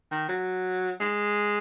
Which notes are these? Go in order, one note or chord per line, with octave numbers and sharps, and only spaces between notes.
D#3
F#3
G#3